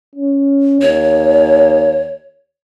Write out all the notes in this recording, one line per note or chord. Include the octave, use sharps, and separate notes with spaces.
C#4
D#2 C#5